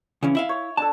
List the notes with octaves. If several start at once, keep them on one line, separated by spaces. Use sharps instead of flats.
C#3 E3 C#4
E4 E5 F5
C#5
D4 A4 A5